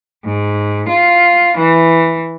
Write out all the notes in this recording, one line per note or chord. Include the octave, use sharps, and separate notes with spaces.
G#2
F4
E3